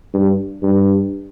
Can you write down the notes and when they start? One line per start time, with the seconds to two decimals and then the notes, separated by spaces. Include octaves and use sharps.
0.14 G2
0.63 G2